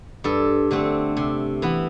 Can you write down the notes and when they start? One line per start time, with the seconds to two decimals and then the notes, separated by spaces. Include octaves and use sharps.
0.24 G2 A4
0.71 D3 A3 C4
1.17 C3
1.62 E3 B3